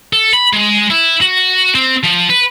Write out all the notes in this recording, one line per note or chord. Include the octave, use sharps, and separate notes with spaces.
A4
B5
G#3
E4
F#4
C4
F3
B4